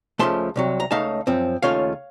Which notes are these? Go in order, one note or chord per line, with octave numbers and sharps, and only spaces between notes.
C#2 C#3 F3 A3 A5 C6
C2 C3 F#3
A#5
C#2 C#3 A3 D#4 F5 A5
F#2 F3 C4
D#2 C#3 A3 C#4 F4 C#5 F5